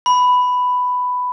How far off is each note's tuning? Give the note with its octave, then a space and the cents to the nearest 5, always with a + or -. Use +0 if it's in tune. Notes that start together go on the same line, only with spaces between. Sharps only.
B5 +10